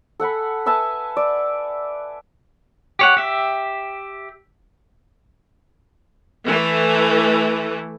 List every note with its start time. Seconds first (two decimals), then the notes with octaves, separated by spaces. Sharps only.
0.20 A4 F#5 G#5 B5
0.66 B4 E5 G#5 A5
1.17 D5
2.99 G4 C#5 F#5
3.17 G4 E5
6.46 E3 A3